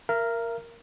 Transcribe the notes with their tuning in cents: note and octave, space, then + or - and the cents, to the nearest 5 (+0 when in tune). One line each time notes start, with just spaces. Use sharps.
A#4 +0 E5 +45